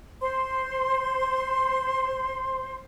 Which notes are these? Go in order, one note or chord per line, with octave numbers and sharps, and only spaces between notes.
C5 C6